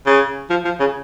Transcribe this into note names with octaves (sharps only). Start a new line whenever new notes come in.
C#3
F3
F3
C#3